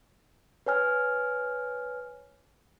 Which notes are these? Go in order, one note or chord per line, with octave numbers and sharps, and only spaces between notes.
B4 C#5 G#5 F6